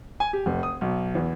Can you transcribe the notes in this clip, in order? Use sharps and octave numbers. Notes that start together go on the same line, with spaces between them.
G#5
G4
F1
D#6
B1
E2